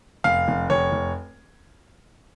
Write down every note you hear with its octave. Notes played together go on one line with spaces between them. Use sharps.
F1 F5
F1
F1 C#5
F1